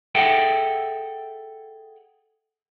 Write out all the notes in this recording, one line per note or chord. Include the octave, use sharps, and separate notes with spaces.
G#4 A4 E5 F#5 G5